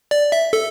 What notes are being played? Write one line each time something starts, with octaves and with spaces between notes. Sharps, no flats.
D5
E5
A4